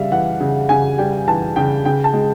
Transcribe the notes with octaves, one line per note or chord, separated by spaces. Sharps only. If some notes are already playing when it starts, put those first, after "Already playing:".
Already playing: C#3 G3 E5 F5
E3 F#5
C#3
C#3 G#5
G3 G5
E3 A5
C#3 G5
C#3 G5
A5
G#3